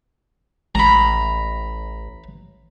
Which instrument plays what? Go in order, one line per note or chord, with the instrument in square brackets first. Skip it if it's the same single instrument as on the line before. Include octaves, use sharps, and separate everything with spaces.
[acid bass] A1 [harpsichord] A#5 B5